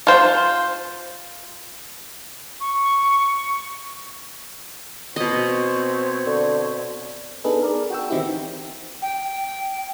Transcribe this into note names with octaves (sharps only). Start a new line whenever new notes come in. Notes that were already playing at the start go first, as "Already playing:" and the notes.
F4 C5
C#6
B2 C4 C#5 D#5
D3
B3 D4 D#4 G#4 A4 B4
G#4 A#4 D5
F#4 G5 E6
D#3 E3 C4 D#4 E4 G4
G5